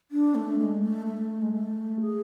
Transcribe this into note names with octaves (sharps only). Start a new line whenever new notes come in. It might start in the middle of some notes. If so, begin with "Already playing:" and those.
D4
A3
G#3
A3
A3
G#3
A3
G#4